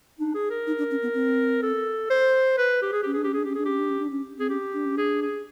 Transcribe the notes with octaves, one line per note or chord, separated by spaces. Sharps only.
D4 D#4
G#4
A#4
D#4
D4
C#4
B3
C4
A4
C5
B4
G4
G#4
C#4 G4
D4 G#4
C#4 G4
D4 G#4
C#4 G4
D4 G#4
C#4 G4
D4
C#4
D4
C#4
C4 G#4
C#4 G4
D4
C#4
D4 G#4
G#4